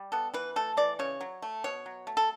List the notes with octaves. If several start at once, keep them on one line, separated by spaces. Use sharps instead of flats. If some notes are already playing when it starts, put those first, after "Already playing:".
Already playing: G3
B3 A4
E3 B4
A3 A4
E3 D5
C#3 C#5
F#3
A3
B2 C#5
F#3
A3
A4